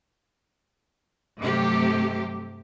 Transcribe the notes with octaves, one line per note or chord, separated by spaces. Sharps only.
G2 C3 F#3 A3 G4